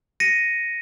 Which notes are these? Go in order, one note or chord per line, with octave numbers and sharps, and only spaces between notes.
A#6 C#7 D#7